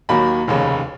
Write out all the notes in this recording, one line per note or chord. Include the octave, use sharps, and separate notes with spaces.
D#2 D#3 F#3 A#3 B5
F1 D#2 C#3